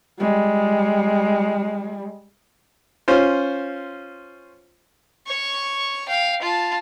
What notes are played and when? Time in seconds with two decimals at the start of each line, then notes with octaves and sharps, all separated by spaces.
0.19 G3 G#3
3.08 C#4 F4 C5
5.26 C#5 C#6
6.08 F5 G5
6.42 F4 A5